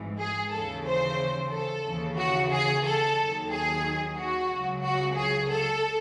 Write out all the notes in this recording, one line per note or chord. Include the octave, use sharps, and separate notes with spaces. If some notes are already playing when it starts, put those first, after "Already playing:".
Already playing: G#1 G#2 E3
G#4
D#2 C#3 E3 A4
C5
A4
D#2 C#3 E3
F#4
G#4
A4
D#2 D#3 F#3
G#4
F#4
C#2 C#3 F#3
F#4
G#4
A4